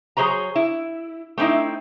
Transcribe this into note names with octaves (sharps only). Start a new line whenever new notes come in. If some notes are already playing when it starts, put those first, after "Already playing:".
F#3 G#4 C5 C#5 A#5
E4
A3 C4 C#4 D#4 E4